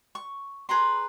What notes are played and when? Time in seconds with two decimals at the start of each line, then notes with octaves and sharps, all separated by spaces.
0.15 C#6
0.69 G#4 B4 A#5 C6